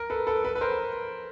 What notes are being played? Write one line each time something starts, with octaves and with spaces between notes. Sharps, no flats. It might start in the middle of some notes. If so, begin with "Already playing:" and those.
Already playing: A#4
A4 B4
A4 B4
A4 B4
B4
A#4 C5